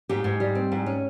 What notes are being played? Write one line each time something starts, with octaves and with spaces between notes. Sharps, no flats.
G#2 G4
G#2
G3
C4
G#2
C#4